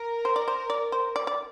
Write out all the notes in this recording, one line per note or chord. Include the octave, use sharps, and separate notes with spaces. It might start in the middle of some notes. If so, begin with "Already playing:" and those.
Already playing: A#4
C5
D5
C5
D5
C5
D5
D5